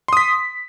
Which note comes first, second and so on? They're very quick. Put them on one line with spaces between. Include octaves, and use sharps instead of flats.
C6 D#6 B6